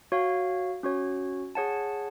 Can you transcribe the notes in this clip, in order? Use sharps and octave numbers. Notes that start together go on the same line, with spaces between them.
F#4 C#5 F5
C#4 F#4 C#5
G#4 C#5 F#5 A5